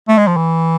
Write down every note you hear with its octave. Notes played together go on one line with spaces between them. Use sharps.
A3
G#3
F3
E3